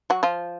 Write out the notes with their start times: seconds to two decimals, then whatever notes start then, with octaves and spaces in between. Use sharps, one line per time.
0.10 F#3 F#4
0.23 F3 F4